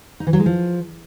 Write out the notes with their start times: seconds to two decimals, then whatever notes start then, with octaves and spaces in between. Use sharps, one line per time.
0.20 D#4
0.27 E3
0.33 F#3
0.40 G#3
0.46 F3